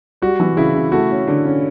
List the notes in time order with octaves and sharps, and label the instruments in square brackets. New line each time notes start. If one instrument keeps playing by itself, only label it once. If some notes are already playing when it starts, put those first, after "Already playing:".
[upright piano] G3 [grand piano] F#4
[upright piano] E3
[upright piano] C#3 [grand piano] E4
[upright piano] C#3
[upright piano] A3 [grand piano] F#4
[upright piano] C#4
D3
C#4